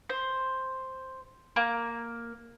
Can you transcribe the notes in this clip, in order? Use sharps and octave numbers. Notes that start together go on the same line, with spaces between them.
C5
A#3